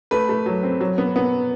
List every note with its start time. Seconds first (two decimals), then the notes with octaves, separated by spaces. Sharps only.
0.11 A3 B4
0.29 A3
0.46 F#3
0.63 C4
0.81 F#3
0.98 B3
1.16 B3